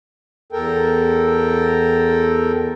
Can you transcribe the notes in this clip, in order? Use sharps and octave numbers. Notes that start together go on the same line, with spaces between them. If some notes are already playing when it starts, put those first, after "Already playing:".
E2 A4 A#4 G5